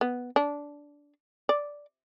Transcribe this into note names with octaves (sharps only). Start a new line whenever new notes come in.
B3
D4
D5